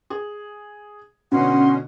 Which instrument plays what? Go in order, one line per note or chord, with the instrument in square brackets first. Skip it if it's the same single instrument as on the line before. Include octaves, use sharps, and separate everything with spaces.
[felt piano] G#4
[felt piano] B2 D3 [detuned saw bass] C#4 [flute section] D#4 F#5 C6